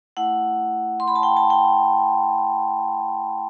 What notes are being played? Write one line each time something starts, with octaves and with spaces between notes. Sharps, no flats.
A3 E4 F#5
C6
B5
A5
G5
A5
G5